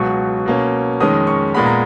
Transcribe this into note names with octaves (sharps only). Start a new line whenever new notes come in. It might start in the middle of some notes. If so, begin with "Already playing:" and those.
Already playing: C#2 B2 F#3 C#6
B2 A#3 C#4
F2 D#3 G#3 C#4 D#6
C#6
A#2 G#3 B3 B5
A#5